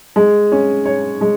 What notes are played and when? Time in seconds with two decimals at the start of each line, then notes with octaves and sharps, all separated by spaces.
0.16 G#3
0.52 C#4
0.86 C#5
1.21 G#3